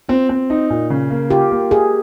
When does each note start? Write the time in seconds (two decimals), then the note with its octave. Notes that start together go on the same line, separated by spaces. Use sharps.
0.09 C4 F4
0.29 C4
0.50 D#4
0.70 A#2
0.90 C#3
1.11 A#3
1.30 F4 G4
1.51 A#3
1.71 G4 G#4